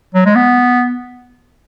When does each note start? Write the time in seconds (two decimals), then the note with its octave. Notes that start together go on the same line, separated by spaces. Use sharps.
0.14 F#3
0.26 G#3
0.35 B3